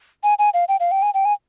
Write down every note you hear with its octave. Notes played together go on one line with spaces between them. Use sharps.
G#5
G#5
F5
G5
F5
G5
G#5
G5
G#5